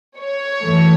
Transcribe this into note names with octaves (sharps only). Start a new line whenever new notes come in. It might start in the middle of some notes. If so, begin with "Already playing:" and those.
C#5
F#2 E3 A3